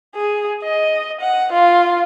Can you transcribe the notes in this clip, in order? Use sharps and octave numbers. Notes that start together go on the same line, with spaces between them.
G#4
D#5
F#5
F4